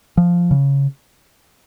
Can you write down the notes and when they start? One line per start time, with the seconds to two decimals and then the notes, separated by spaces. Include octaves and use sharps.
0.17 F3
0.51 C#3